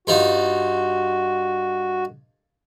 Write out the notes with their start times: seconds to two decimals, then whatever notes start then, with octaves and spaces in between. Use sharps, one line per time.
0.07 G2 D#4 F4 F#4